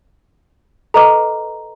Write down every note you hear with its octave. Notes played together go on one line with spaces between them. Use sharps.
A4 B4 D#5 A#5 D6